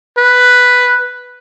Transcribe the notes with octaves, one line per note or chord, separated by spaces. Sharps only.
B4